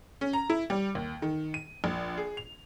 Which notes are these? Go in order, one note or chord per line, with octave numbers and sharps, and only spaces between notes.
C#4
A#5
E4
G3
D#2
D#3
D#7
A#1
G#4
F7